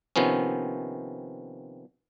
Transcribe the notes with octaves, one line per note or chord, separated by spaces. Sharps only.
C3 D#3 F3 B3 C#4